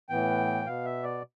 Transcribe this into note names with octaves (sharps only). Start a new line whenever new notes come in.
A2 E3 B3 G5
B2 B3 F5
E5
D5